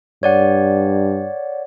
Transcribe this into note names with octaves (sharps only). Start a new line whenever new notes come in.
G2 C#5 D5 F#5